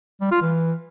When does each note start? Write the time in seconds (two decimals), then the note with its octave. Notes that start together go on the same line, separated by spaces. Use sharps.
0.21 G3
0.31 F4
0.42 E3